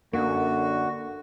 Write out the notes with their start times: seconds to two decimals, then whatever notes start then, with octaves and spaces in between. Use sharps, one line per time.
0.13 F#2 D3 A#3 F#4